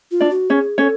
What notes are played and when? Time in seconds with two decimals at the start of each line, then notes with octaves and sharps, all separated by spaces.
0.11 F4
0.21 D4 D5
0.31 F#4
0.50 C#4 G#4 C#5
0.78 C#4 A4 C#5